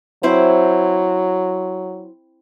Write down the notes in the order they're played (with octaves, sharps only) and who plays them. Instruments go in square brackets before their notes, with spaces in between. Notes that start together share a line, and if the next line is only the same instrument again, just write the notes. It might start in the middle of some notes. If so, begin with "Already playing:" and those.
[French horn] F#3 [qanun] C4 E4 C5